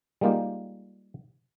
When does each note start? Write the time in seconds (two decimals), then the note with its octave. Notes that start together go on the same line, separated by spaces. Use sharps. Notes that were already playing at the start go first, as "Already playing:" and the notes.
0.21 G3 G#3 A#3 D#4 F4 G4